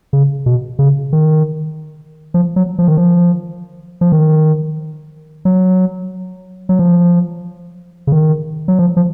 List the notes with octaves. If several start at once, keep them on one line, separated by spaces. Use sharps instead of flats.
C#3
B2
C#3
D#3
F3
F#3
F3
D#3
F3
F3
D#3
F#3
F#3
F3
C#3
D#3
F#3
F3
F3